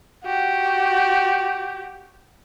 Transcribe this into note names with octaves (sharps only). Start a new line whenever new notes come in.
F#4 G4